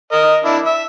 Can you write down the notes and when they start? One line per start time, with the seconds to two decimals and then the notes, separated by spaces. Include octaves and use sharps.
0.12 A#4 D#5
0.45 D4 E4
0.66 E5